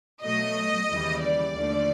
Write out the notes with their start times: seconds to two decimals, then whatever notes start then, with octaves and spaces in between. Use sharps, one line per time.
0.22 B2 F#3 A3 D#5
0.88 D#2 C#3 E3 G3
1.20 D5
1.52 D#2 D3 F3 A3